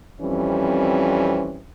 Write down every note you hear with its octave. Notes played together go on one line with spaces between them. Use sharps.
F2 E3 G3 C4 C#4